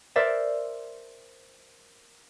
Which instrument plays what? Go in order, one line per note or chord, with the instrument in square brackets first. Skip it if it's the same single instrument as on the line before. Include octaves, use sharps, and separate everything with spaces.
[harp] A#4 C5 D5 E5